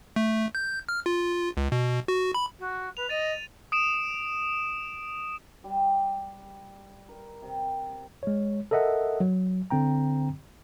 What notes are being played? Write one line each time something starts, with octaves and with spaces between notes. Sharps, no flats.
A3
G6
F6
F4
C#2
B2
F#4
B5
F#4
B4 F7
D#5 A6 D#7
D#6 D7 E7
G3
A#4
C3
G#3 C#5
A4 A#4 D#5 E5 F#5
F#3
D3 C4 G5 A#5